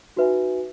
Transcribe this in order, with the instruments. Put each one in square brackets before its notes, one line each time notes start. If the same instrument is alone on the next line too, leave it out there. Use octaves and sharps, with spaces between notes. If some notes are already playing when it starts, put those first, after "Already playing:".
[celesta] D#4 F#4 B4 E5 G#5